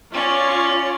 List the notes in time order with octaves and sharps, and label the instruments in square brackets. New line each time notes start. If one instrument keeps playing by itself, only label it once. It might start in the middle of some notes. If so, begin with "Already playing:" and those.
[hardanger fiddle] C#4 D5 [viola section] F4 C#5